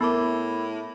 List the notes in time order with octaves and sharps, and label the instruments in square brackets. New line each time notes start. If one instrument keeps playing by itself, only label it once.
[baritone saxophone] A2 [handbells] B3 D6 [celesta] A#4 A5 B5